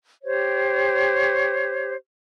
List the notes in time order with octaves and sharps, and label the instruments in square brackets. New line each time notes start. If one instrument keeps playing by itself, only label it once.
[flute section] G4 C5 C#5